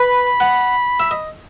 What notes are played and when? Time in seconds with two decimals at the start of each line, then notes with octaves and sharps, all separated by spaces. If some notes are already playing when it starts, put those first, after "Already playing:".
Already playing: B4 B5
0.40 F#5
1.00 E5
1.11 D#5